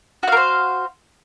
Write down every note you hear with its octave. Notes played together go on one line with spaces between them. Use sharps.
F#4 A#4 C5 F5